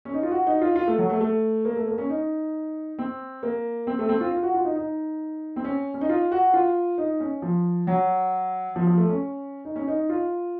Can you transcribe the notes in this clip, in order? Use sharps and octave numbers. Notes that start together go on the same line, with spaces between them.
C#4
D#4
F4
F#4
D#4
F4
F4
A3
F#3
A3
A3
A#3
A3
A#3
C#4
D#4
C4
A#3
C4
A3
C4
F4
F4
F#4
F4
D#4
D#4
C4
C#4
C#4
D#4
F4
F#4
F4
D#4
C#4
F3
F#3
F3
F3
A3
C#4
D#4
C#4
D#4
F4